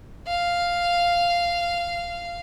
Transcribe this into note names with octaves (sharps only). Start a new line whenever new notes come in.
F5